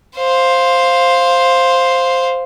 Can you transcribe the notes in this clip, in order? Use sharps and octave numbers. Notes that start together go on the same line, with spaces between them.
C5 F5